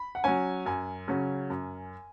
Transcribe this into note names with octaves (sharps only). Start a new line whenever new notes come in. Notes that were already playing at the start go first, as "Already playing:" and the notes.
Already playing: B5
F#5
F#3 C#4 G#5
F#2 G#5
C#3 F#3 C#4
F#2